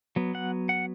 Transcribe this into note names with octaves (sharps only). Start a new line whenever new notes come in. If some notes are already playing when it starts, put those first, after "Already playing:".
F#3 B3
F#5
F#5